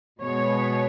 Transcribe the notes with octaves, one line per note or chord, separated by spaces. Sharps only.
B2 G#3 B3 C#5